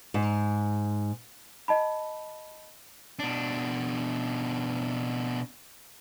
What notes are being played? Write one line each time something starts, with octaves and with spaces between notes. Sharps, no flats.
G#2
D#5 A5 B5
B2 D4